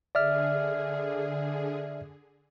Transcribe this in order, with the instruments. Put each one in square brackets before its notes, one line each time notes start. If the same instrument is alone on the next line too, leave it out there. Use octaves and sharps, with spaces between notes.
[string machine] D3 G#4 [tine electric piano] D5 E5 F6